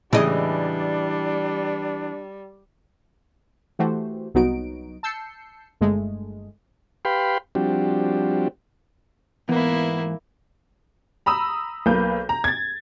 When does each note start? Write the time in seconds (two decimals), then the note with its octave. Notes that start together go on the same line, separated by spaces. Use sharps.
0.13 A2 C#3 E3 G3 G#3 D4 D#5
3.79 E3 A3 F#4 G4 C5
4.34 C2 F#3 B3 D#4 F#4 D7
5.03 A5 E6 G6 C7 C#7
5.81 G1 G#3 A3
7.05 G4 B4 F5 G5 B5 C6
7.55 F3 G3 C4 D4 F#4 G4
9.49 G#2 E3 A#3 B3 E4
11.26 A#5 B5 D#6 E6
11.86 B1 A#3 B4 G6
12.29 A#5
12.44 G#6 A6